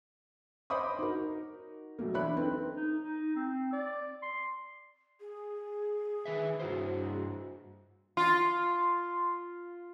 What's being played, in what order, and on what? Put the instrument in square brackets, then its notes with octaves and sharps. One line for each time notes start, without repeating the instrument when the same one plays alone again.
[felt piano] C5 C#5 D#5 B5 D6 D#6
D#4 F#4 A#4
B2 F#3 A3 A#3
E3 D4 E4 C#5 B5 F#6
C4 D#4 A4 B4
[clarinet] D#4
D#4
C4
D5
C6
[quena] G#4
[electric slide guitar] D#3 B4 E5
[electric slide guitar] G2 E4 C5 [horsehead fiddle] F#4
[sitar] F4 [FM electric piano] C6